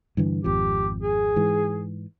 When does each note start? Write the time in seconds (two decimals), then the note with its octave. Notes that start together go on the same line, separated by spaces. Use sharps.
0.17 G2 D3 E3
0.44 G#1 F2 F3 G4
1.02 G#4
1.36 G#2 E3